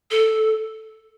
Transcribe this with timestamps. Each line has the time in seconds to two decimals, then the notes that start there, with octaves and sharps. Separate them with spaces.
0.11 A4